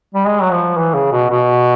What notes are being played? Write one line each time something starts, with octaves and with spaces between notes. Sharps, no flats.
G3
G#3
F#3
F3
E3
C#3
B2
B2